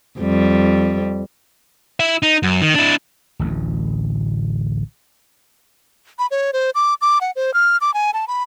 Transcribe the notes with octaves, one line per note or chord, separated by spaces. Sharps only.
F2 G3
E4 E5
D#4
F#2
D#3
D4 E4
D1 A1 D2
B5
C#5
C5
D6
D6
F#5
C5
F6
D6
G#5
A5
B5